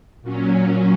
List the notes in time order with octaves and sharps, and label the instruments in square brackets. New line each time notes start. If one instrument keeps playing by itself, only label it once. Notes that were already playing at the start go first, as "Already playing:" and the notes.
[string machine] A#2 F#3 C#4